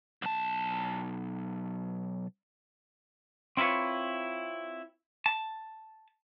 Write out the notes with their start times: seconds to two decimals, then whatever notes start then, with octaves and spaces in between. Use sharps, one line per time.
0.22 B1 A5
3.57 C4 E4 F4 B4 C#5
5.26 A5